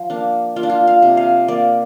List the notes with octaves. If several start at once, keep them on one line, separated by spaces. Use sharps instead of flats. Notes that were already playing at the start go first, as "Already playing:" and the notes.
Already playing: F3 F4
A#3 D4
A#3 F4
D4
F4
F5
C3
F5
A#3 D5